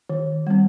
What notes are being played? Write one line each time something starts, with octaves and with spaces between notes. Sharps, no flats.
D#3
G3 C4